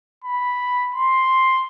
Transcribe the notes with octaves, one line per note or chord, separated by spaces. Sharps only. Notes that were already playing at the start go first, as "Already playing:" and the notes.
B5
C6